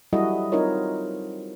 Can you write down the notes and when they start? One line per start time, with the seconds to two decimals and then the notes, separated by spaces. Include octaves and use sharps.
0.13 F#3 G3 E4 F#4 A4 D#5
0.52 C4 D#4 F4 A#4 C#5